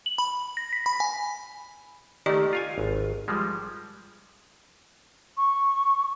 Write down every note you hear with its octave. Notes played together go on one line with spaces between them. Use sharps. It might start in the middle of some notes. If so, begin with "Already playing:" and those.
F#7
B5
A#6
B6
B5
G#5
D#3 A3 G4 D5 D#5
F4 F5 G#5
G#1
F3 G3 G#3
C#6